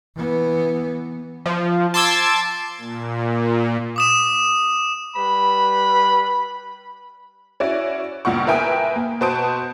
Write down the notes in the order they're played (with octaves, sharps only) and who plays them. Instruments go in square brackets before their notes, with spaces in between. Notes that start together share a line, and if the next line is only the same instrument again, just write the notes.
[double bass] E3 B3
[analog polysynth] F3
A5 C6 D6 E6 G#6
[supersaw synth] A#2
[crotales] D6 D#6 E7
[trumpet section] G3 B4 B5
[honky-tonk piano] C#4 E4 F#4 D5
C#2 G2 A#2 F#5 C#6
A#4 B4 E5 G5 G#5 D#6
A#3
B2 B4 C5 A5 D#6 D7